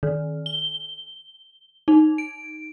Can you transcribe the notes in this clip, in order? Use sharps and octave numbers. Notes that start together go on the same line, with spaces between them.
D#3
G7
D#4
D7